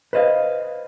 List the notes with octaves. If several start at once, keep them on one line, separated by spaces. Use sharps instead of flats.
B4 C5 D#5 F5